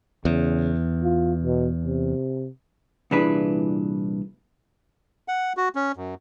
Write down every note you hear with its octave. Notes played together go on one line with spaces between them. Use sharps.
E2 C#3
F4
B2
C3
C2 A#2 E3 D4 G#4 B4
F#5
F#4
C#4
F#2